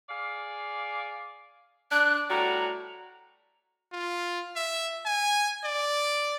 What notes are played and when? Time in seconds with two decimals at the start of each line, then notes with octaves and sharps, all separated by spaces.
0.09 G#4 D5 F5
1.91 D4 F#6
2.30 A2 G3 F#4 A#5
3.92 F4
4.56 E5
5.05 G#5
5.64 D5